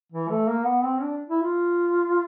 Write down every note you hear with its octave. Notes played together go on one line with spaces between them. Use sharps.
E3
A3
A#3
B3
C4
D4
E4
F4